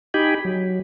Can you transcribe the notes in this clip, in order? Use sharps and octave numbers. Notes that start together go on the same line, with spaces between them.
D#4 G4 G5 G#5 B5
F#3